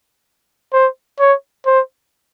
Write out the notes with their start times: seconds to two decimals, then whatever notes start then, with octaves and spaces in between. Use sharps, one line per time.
0.73 C5
1.19 C#5
1.66 C5